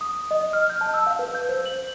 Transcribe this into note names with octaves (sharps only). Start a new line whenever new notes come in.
D#6
D#5
F6
G6
A5
E6
F5
B4
G6
C5
F#7